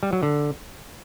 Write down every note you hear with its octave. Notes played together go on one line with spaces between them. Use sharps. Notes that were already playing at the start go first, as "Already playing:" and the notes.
G3
F#3
D3